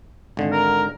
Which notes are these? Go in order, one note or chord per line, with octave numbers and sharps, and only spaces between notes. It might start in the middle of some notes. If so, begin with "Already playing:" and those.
G#1 D3
A#4